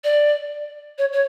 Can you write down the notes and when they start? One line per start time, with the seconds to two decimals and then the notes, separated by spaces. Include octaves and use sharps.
0.04 D5
0.98 C#5
1.13 C#5